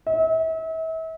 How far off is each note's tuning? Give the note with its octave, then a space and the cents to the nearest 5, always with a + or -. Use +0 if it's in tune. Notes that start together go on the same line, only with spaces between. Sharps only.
E5 -35